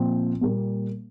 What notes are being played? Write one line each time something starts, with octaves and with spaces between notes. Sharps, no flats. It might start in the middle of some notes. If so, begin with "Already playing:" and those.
Already playing: A#2 F3 C4
A#2 G3 A#3